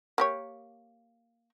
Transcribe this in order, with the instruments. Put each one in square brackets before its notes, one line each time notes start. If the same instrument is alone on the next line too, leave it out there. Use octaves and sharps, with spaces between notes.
[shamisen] A#3 G4 C#5